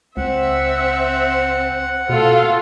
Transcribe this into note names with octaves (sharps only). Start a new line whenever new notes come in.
C#2 C4 E5 F#5
B2 A3 F4 A4